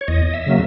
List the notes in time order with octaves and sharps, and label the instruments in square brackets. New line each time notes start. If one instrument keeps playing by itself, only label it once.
[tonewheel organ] C#5
E2 D#5
E5
C#3 F#3 A#3